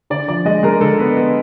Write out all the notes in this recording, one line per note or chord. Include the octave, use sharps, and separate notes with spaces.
D3 D5
F3 D5
G#3 D#5
G#3 A#4
D3 A4
B3
B3